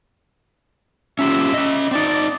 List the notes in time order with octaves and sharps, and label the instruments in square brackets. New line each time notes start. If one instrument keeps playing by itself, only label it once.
[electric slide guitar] C#4 F4 G4 [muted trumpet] E5
[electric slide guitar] C#4 D#5
[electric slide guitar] C4 D#4 [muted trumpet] D5